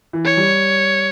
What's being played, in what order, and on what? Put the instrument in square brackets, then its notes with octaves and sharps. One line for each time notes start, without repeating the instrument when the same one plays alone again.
[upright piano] E3
[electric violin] C#5
[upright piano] G3